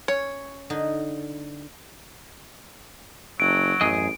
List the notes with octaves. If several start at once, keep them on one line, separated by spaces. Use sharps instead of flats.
C#4 C#5
D3 D#4
F#1 F#3 D7
A1 F#2 G#4 D#5